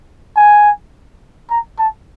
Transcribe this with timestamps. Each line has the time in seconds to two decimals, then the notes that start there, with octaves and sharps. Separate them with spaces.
0.36 G#5
1.50 A#5
1.79 A5